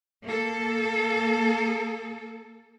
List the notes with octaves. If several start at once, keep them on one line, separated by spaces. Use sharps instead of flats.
A#3 A4